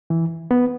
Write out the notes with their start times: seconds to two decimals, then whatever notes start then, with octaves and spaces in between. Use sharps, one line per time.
0.10 E3
0.51 B3